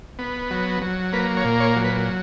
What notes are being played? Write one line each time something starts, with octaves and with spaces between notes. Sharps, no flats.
B3
F#3
F#3
A#3 B4
C#5
A#2
C#5
F#3
B4